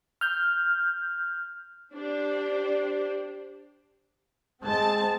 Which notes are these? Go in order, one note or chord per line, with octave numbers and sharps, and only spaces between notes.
F6 G6
D4 G4 C5 D5
G#3 C4 A5